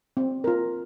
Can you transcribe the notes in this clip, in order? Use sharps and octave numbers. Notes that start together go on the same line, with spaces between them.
C4
F4 A#4